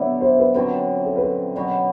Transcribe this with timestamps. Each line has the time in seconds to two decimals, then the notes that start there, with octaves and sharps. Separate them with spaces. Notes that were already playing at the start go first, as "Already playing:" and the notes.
Already playing: D3 F#3 B3 D5 E5
0.21 C5
0.39 B4
0.54 F#2 D3 F#3 C4 B4
1.05 A4
1.16 B4
1.21 A4
1.55 B2 F#3 B3 F#4 D5